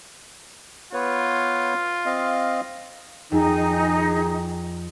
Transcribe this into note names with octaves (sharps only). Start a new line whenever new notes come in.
B3 F4 B4 C#5
C4 D#5 F5
F2 D#3 D#4 G#4